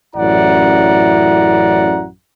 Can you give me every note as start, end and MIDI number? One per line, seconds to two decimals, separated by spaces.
0.16 2.06 33
0.16 2.06 42
0.16 2.06 64
0.16 2.06 74
0.16 2.06 78
0.16 2.06 82